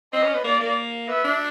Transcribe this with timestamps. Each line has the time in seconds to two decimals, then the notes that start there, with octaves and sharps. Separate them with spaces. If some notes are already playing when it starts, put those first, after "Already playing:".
0.13 C4 D#5
0.23 C#4
0.34 B3
0.44 A#3 D5
0.60 A#3
1.08 B3 E5
1.24 D4